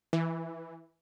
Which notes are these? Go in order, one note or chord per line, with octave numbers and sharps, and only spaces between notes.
E3